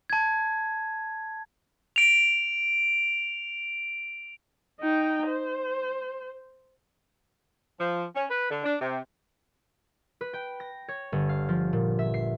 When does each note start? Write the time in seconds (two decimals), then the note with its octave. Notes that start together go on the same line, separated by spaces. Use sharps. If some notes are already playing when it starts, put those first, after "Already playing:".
0.10 A5 G#6
1.96 D7 F7
4.80 D#4 G5
5.27 C5
7.80 F3
8.16 C#4
8.30 B4
8.51 D3
8.64 D4
8.81 C3
10.21 B4
10.33 G5
10.60 A#6
10.88 C#5
11.12 G1
11.29 F5
11.49 F3
11.73 A#2
11.99 E5
12.14 C7